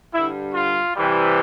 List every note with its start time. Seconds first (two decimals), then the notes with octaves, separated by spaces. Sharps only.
0.14 G2 D3 G3 E4
0.54 F4
0.95 C3 E3 G3